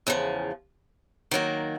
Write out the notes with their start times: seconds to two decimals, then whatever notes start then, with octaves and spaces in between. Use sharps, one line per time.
0.07 E2 C#3 F3
1.31 D#3 F#3 A#3